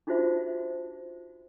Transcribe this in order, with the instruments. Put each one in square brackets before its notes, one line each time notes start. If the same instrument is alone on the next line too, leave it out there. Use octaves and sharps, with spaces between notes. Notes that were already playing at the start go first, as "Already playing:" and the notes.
[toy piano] D4 D#4 F4 F#4 C5 E5